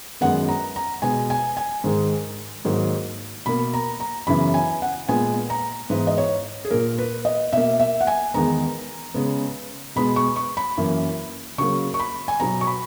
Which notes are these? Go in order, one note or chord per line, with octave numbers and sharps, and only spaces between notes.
F#2 D#3 G#3 B3 F#5
A#5
A#5
B2 G#3 B3 G#5
G#5
G#5
G#2 D#3 G#3
G#2 D#3 F#3 A#3
B2 A#3 B5
A#5
A#5
F#2 C#3 E3 B3 B5
G#5
F#5
A#2 G#3 B3 G#5
A#5
G#2 E3 B3 B4
D#5
C#5
G#4
A#2 A#3 A#4
B4
D#5
B2 A#3 E5
E5
F#5
G#5
E2 D#3 G#3 B3 A#5
C#3 G#3 B3
B2 G#3 B3 B5
C#6
C#6
B5
F#2 E3 A#3
C#3 F#3 A#3 C#6
C#6
B5
G#5
B2 F#3 B3 A#5
C#6
B5